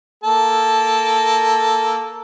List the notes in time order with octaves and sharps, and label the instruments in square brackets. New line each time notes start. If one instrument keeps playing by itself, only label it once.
[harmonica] A#3 A4 A5